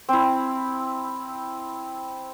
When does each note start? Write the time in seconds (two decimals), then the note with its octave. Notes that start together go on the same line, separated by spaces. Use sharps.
0.09 C4 E4